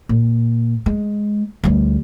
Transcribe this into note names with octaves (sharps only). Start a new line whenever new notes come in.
A#2
G#3
D2 G3